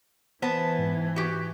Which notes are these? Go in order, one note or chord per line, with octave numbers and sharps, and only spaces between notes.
E3 B3 C5 A5
G#2
F#4 G4